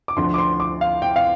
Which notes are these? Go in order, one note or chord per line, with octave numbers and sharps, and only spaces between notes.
D6
D2 D3 F3 C6
D6
C6
D6
F5
G5
F5